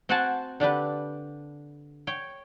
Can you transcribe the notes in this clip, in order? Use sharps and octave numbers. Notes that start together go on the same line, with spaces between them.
C4 F#4 C5 F#5 G#5 A5
D3 D4 G4 B4
C#5 G5